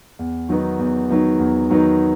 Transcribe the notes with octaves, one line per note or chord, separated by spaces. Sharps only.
E2
D#3 F#3 B3 D#4
E2
D#3 F#3 B3 D#4
E2
D#3 F#3 B3 D#4